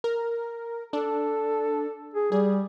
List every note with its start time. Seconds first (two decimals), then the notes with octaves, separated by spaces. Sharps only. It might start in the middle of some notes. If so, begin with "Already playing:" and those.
0.04 A#4
0.93 D4 A4
2.14 G#4
2.32 G3 G#4